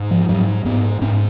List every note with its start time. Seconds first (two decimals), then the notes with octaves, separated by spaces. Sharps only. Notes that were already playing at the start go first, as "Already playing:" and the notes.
Already playing: G#2
0.11 F3
0.29 G#2 F#3
0.65 G#2 B3
1.01 G#2 C#4